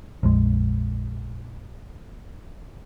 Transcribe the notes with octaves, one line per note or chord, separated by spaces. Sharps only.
A#1 F2 G#3